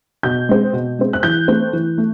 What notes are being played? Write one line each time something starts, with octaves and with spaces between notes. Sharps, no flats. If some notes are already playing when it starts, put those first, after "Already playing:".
B2 G6
G#3 C4
B2
G#3 C4
F#6
E3 G6
A3 C4
E3
A3